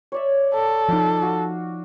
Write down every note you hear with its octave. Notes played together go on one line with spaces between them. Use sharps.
C#5 D5 E5
A4
F3 D#4 F5 D6
F#4 F5